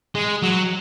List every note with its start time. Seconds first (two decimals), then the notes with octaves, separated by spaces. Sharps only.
0.15 G#3
0.42 F#3